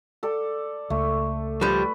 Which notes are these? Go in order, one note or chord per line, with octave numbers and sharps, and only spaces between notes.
A4 D5
C#2 A3
F3 G3 B4